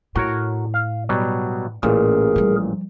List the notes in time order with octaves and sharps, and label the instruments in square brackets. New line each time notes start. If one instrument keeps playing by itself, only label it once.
[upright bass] A2 [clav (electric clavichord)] F#4 A#4 C#5
[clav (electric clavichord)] F5
B2 F#3 G3
[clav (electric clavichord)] A1 A#2 [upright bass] C#4 [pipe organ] G#4 A#4
[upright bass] F3 G3